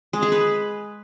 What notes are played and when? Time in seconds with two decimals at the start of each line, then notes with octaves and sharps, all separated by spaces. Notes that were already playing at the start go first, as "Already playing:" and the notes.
0.13 G#3
0.23 G#4
0.32 B4